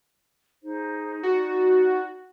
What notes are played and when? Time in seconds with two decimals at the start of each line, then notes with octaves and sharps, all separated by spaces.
0.63 D#4 G#4 C5
1.23 D#4 F#4 D5